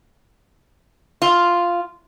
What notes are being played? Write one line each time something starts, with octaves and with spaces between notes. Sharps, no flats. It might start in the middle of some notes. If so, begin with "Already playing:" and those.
F4